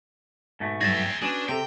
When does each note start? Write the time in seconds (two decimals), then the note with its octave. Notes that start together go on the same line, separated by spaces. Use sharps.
0.60 G#2 B2 A3
0.81 G2 F#3 G#4 E5 G5 A6 A#6
1.22 C#4 D4 F#4 G#4 B4
1.49 C3 C4 A4 G5